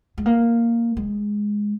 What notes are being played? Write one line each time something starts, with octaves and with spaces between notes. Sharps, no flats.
G#3
A#3
G#3